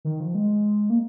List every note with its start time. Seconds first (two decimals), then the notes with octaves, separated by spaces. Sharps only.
0.05 D#3
0.20 F3
0.35 G#3
0.90 A#3